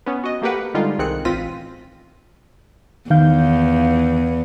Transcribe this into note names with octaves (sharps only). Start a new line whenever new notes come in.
B3 C#4
F#4 D#5
A3 A#3 G4 A#4 B4 F#5
D3 G3 G#3 D#4 F4
C2 D#3 C4 G#4 F#6 C#7
A1 C4 F4 A#6 B6 D#7
E2 D#3 F5 G6